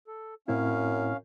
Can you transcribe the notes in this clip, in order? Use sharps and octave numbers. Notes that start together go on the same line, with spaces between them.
A4
F#2 A2 C4 C#4 E4 F5